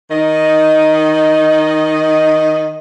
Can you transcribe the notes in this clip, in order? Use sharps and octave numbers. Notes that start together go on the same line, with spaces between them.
D#3 D#4 D#5